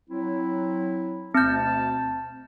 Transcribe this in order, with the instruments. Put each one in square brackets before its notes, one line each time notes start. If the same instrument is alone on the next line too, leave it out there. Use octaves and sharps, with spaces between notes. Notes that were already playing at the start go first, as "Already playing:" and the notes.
[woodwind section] F#3 C4 E4
[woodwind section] D2 B2 A5 [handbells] C4 G6